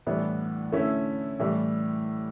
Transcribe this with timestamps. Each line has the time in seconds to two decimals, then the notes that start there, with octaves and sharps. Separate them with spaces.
0.07 A2 E3 G3 B3 D4
0.72 D3 A3 C#4 E4
1.39 A2 E3 G3